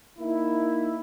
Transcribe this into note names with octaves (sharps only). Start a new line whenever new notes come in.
A#3 D#4 E4